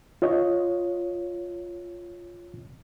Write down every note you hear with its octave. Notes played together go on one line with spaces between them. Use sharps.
F4 C#5 D#5